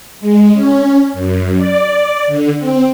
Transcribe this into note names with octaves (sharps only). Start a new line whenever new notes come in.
G#3
C#4
F#2
D5
D3
C4